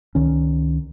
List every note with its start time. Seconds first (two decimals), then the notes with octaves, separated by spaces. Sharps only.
0.15 C#2 D#3 C#4